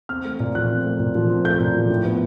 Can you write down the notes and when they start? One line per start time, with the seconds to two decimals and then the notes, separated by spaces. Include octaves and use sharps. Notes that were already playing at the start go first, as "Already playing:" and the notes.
0.09 C4 F6
0.25 A3
0.40 A#2
0.55 F3 F#6
0.70 C4
0.85 A3
1.00 A#2
1.15 F3
1.30 C4
1.45 A3 G6
1.60 A#2
1.75 F3
1.90 A2
2.05 B3